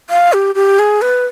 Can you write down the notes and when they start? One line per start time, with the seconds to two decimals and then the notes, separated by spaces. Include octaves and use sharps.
0.10 F5
0.33 G4
0.55 G4
0.79 G#4
1.02 B4